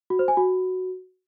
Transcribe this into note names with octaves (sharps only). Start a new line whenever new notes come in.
F#4
C5
G#5
F#4